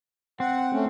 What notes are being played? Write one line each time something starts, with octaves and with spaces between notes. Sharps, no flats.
C4 F#5
A3 C#4